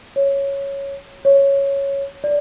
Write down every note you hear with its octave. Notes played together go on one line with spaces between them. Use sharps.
C#5
C#5
D5